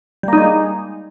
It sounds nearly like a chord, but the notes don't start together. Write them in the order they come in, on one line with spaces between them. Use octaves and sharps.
G3 A#3 D#4 G#3